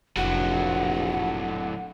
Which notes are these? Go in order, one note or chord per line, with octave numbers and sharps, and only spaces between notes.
F1 A#1 A2 F#3 F#5